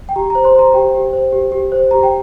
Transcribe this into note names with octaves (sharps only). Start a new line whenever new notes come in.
G5
G4 A#5
C5 A#5
C5 C6
C5 A#5
G4 G5
G4
C5
G4
G4
C5
G4 A#5
G5